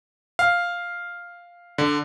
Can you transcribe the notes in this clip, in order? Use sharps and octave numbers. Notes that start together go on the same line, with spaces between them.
F5
D3